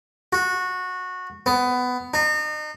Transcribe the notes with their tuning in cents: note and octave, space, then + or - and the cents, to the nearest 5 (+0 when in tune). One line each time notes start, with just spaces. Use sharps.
F#4 -20
B3 +15
D#4 -35